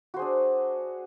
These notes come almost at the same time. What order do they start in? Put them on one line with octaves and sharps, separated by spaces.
F#4 C5 G#4 D4